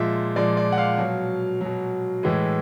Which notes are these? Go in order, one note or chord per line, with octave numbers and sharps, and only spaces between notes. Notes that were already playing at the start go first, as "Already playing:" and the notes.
Already playing: A#2 F3 G#3 E5
A#2 F3 G#3 D5
D5
F#5
F5
B2 F#3
B2 F#3
A2 E3 G#3